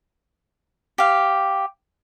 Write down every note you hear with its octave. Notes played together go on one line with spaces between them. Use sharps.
G4 F5